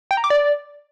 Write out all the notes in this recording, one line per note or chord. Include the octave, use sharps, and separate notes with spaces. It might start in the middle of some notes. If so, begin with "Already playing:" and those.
G5
A#5
D6
D5